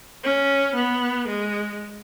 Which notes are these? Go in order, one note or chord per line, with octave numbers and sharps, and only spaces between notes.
C#4
B3
G#3